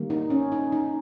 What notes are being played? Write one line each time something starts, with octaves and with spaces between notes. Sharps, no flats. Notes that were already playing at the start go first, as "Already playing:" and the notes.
Already playing: D#3 G3 A#3
D#4
C#4
D#4
D#4